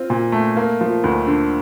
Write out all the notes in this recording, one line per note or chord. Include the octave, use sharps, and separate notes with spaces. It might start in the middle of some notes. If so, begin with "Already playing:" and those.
Already playing: C4 F4
A#2
A3
A#3
F3
D2
D3